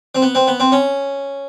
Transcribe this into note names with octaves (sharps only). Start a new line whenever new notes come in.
C4
B3
C4
B3
C4
C#4